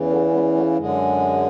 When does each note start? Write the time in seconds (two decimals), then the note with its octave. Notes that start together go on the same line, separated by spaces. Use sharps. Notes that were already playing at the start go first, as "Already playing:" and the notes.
Already playing: E2 C#3 E3
0.10 F#3 A3
0.27 C#4
0.32 G#3 B3
0.55 F#3 A3
0.77 F#2 D3 G#3